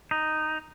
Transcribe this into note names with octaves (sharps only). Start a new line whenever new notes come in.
D#4